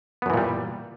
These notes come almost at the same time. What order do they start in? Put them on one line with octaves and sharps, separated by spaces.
B3 F#2 E3 A#2 G3